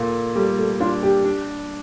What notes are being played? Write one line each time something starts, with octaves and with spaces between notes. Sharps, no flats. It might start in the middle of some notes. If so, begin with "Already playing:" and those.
Already playing: A#2 A4
G3 A3
A3
D4 F4
G4
D4